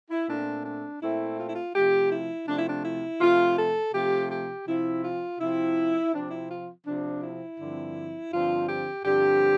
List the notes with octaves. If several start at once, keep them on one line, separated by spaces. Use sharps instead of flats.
E4
A#2 A3 C4 D4
D4
A#2 A3 C4 E4
F4
E4
F4
C3 F3 A3 G4
E4
C3 F3 A3 D4
E4
D4
E4
C3 F3 A3 F4
A4
C3 F3 A3 G4
G4
C3 F3 C4 E4
F4
C3 F3 C4 E4
C3 F3 C4 D4
E4
F4
C3 F3 C4 D4
E4
G2 D3 F3 C4
G2 D3 F3 C4 F4
G4
G2 D3 F3 C4 G4